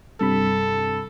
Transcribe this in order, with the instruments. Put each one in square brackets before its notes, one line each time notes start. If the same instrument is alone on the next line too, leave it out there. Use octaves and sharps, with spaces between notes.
[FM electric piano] G2 C3 B5 [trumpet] A4